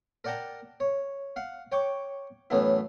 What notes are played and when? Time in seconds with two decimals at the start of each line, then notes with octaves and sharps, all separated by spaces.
0.24 A#4 D5 F#5 G5 A5 A#5
0.80 C#5
1.36 F5 F#5
1.72 C#5 G5 C#6 D6
2.50 F#2 A2 E3 A3 B3 E4